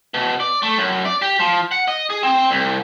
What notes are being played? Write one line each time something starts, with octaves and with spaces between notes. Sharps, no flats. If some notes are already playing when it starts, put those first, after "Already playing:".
B2
D5
A3
F#2
D5
G4
F3
F#5
D#5
G#4
C4
C2